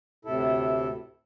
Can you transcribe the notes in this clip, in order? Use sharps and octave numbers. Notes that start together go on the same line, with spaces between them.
D2 A2 C3 E4 A4